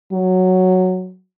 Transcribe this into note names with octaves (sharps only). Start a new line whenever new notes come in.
F#3